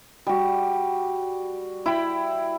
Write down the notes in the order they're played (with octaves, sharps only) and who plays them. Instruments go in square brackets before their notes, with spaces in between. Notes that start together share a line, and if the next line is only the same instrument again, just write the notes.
[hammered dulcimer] G3 F#4
E4 G5 B5